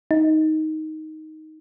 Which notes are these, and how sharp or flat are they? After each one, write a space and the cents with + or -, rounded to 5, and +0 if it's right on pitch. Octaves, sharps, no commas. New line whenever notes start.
D#4 +10